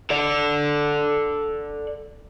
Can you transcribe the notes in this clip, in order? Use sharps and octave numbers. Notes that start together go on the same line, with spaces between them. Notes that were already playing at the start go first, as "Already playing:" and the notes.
A4 D5